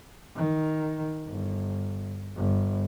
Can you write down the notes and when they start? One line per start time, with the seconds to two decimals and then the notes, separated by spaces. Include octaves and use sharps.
0.36 D#3
1.26 G1
2.36 G1